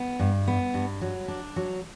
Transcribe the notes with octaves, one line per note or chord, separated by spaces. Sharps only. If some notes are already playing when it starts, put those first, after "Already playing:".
Already playing: B3
G2
B3
G2
F#3
D4
F#3